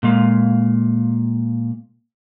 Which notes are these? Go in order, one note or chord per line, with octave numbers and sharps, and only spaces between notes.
A#2 G#3 F5